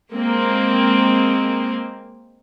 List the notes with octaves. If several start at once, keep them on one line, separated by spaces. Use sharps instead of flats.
G#3 A#3 C4